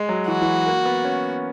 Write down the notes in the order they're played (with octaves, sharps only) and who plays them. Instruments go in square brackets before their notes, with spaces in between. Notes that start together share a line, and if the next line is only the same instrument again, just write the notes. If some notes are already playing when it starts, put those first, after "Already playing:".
Already playing: [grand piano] G#3
F#3
[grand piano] E3 [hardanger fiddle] F#4
[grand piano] E3
A#3
B3
C#4